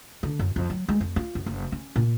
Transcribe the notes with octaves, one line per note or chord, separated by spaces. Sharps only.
D3
F#2
F2
F#3
G#3
F2
F4
F#2
F#1
C#4
A#2